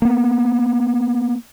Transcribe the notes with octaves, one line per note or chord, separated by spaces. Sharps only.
A#3 B3